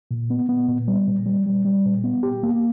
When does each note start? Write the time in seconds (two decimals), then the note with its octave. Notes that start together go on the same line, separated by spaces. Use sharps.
0.11 A#2
0.30 B3
0.49 B3
0.68 A#2
0.88 G3
1.08 A#2
1.26 G3
1.46 G3
1.65 G3
1.85 A#2
2.04 B3
2.23 G4
2.43 A#3